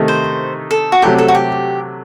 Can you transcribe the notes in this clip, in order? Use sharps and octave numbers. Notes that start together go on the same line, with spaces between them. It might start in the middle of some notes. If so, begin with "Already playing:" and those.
Already playing: C3 D#3 A3 D#4
C5
A4
F#4
C3 F#3 A3 G4
A4
F#4
G4